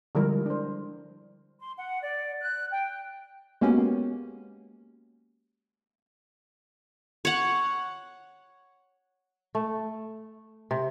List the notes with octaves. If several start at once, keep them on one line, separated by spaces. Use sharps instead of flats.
D3 F3 G3 G#3 E4 A#4
D4 C5
C6
F#5
D5
F#6
G5
G#3 A#3 B3 C#4 F#4 G4
C#5 F#5
A3
C3